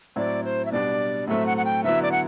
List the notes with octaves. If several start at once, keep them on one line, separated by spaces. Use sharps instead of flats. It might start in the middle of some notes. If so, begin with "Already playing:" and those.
A2 F#3 C4 E4 D5
C5
E5
B2 G3 D4 D5
A2 F#3 A3 C4 E5
F#5
F#5
G5
D3 F#3 B3 E4 E5
D5
F#5